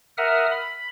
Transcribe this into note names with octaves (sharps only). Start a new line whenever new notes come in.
A#4 E5 F#5 D#6 F6
B5